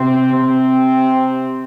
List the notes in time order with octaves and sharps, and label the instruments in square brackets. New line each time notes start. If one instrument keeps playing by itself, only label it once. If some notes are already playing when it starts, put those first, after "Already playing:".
Already playing: [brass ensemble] C3 C4
C3 C4